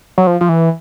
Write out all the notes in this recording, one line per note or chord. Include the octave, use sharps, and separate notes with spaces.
F#3
F3
F3
E3